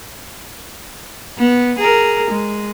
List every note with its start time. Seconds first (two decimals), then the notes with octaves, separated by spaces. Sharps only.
1.38 B3
1.79 G#4 A#4
2.30 G#3